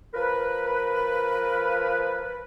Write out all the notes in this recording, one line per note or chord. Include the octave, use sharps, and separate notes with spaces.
F3 A#4 B4